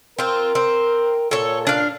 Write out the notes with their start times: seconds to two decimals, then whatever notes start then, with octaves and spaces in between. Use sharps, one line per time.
0.18 C4 F4 A#4
0.55 C4
1.31 A#2 A4 C#5
1.67 D4 F5